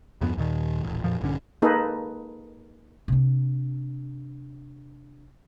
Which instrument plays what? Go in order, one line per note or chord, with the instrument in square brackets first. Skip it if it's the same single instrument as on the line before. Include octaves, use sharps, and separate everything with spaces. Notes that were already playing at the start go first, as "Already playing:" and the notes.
[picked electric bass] E2 G2 F3 B3
D#2 A#2 D#3
D#1 A1
F2 A#2 F3
A#1 G2 D3 C#4
[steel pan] A#3 D#4 G#4 A4 B4
[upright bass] C3 D4